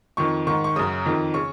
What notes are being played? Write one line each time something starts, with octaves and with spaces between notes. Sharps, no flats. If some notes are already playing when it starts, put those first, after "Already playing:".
F2 D#3 C#6
G#2 D#3 C#6
C#6
F#2 C#3 D#6
F2 D#3
C#3 C#6